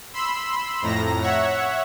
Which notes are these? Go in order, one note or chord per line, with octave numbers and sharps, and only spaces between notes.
B5 C6 E6
F2 A2 A#5 A#6
C#5 E5 F#5